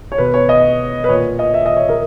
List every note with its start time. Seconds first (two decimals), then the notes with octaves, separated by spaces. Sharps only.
0.12 C#5
0.18 B2 B4
0.34 C#5
0.49 D#5
1.04 B4
1.09 A#2 C#5
1.39 D#5
1.54 E5
1.66 D#5
1.76 C#5
1.89 A#4